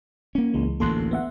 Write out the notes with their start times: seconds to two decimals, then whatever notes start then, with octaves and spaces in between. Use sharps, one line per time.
0.35 A#3 C#4
0.54 C#2 E3 G#3
0.80 A1 D2 A#3 A4 C6 F#6
1.11 B3 E5 F#5